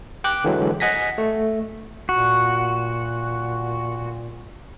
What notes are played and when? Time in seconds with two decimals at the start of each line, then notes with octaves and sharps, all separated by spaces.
0.24 G5 D6 F#6
0.44 D3 E3 F#3 G#3
0.80 D#5 F#5 G#5 A#6 B6
1.18 A3
2.09 A#2 F#4